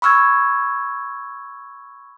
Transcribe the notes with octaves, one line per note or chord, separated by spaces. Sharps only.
B5 C#6 E6 F6 G#6